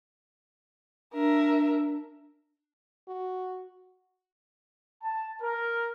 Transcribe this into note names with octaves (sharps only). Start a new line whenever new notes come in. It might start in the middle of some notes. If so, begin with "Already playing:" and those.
D4 A#4 E5
F#4
A5
A#4